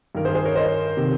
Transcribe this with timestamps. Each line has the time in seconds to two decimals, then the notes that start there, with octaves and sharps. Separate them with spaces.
0.15 G2 D#3 A#4
0.25 G#4 C5
0.35 G#4 C5
0.45 A#4 C#5
0.55 C5 D#5
0.97 C3 D#3